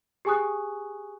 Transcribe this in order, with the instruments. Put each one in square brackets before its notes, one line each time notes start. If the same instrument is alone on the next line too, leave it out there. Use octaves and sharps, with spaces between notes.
[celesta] G4 G#4 G#5 C#6 D#6 F#6